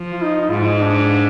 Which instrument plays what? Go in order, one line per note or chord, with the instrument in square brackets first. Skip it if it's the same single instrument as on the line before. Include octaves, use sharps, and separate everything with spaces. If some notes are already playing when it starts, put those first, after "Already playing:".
Already playing: [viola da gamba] F3
[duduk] F4
D#4
D#4
[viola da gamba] G#2 [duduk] F4
[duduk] D#4
D4